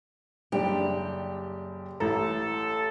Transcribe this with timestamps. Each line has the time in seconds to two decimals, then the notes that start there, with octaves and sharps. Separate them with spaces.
0.52 F#1 G3 D4 G4
2.00 A1 E4 A4 A#5